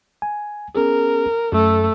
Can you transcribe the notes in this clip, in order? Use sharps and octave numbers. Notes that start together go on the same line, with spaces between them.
G#5
B3 C#4 G#4 A#4
F#2 A3 A4